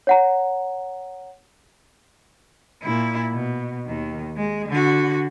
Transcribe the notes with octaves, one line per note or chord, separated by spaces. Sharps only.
C#5 F#5 A#5
A#2 E4
B2
D#2 D#3
G#3
D3 F#4